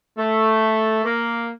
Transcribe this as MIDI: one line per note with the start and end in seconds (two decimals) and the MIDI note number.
0.17 1.01 57
1.04 1.49 58